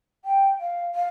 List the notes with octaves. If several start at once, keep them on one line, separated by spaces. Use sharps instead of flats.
G5
F5
F5